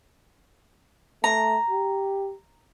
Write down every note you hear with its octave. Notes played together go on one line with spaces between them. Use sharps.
A3 A#5
G4